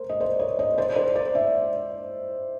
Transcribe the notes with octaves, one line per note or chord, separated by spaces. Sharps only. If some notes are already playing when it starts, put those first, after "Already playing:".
Already playing: A#4 C5
D#5
C5 D5
C#5 D#5
C#5 D#5
C5 D5
C5 D5
C5 D5
D5 E5